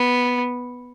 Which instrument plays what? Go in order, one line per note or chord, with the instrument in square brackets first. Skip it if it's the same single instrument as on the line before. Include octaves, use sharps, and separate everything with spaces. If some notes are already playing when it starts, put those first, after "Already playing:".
Already playing: [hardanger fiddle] B3